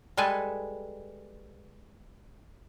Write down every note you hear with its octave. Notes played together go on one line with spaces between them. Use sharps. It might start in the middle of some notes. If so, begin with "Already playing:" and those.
G3 G#3 A4 B4 G#5 A5